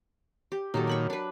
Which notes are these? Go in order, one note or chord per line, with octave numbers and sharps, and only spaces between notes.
G4
A#2 D#3 F#3 G4 A4
A#4 B5 C#6
D4 B4